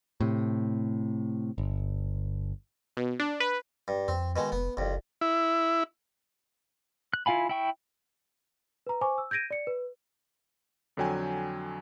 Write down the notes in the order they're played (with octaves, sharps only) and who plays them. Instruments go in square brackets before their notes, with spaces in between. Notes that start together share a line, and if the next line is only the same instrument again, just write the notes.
[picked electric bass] A2 C3
G1
[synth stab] B2
D4
B4
[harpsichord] G2
[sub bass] F2 [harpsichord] C4
[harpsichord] B2 D#3 G#3
[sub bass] F1 [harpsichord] B3
[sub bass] F#1 [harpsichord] C2 F2
[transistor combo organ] E4
[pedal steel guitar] F#6
E4 F4 F5 G#5 B5
E4 G5 C#6
[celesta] B4 A#5
C5 G#5 C#6 D6
E6
G6 G#6 A#6 D7 D#7
D5 C#7
B4
[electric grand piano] F2 D3 F#3 G5 G#5